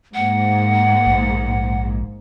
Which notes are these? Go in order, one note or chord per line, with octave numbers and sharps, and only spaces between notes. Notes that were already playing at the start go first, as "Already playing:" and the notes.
G#2 A#3 F#5
A#1